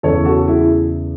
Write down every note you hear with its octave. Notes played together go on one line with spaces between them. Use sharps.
E2 C#3 E3 A4 C#5
F#4 A4
E4 G#4